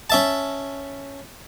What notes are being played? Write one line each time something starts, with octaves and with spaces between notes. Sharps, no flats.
C#4 E5 A5